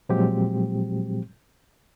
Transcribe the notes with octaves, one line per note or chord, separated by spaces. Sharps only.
A#2 F3 F#3 G#3 C4 G4